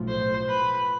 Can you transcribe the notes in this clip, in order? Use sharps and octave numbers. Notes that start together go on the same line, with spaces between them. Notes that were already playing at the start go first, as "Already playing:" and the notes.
Already playing: B1 A2 F3 A3
C5
B4